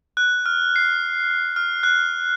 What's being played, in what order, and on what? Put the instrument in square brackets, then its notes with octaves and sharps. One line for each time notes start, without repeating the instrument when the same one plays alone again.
[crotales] F#6
F6
C7
F6
F#6